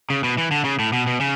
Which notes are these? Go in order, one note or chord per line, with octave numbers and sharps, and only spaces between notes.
C#3
B2
E3
D3
C#3
A2
B2
B2
C#3